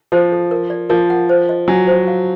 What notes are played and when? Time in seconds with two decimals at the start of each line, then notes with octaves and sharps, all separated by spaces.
0.12 F3 C5
0.32 A4
0.51 A#4
0.70 D5
0.89 F3 A#4
1.10 F#5
1.29 C5
1.49 D#5
1.68 F#3 G#5
1.87 C5
2.08 F5